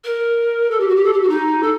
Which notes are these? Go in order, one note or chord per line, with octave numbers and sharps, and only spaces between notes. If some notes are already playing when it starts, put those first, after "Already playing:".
A#4
A4
G4
F#4
G4
A4
G4
F#4
D#4
A4